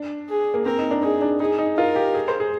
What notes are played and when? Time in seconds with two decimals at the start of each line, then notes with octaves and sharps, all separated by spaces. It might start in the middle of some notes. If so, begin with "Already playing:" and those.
Already playing: D4
0.29 G#4
0.54 A#3
0.65 C4 A#4
0.79 D#4
0.91 D4
1.03 D#4 G#4
1.22 D4
1.40 D#4 G#4
1.58 D#4
1.77 F4 A#4
1.96 G4
2.15 G#4
2.28 C5
2.40 G#4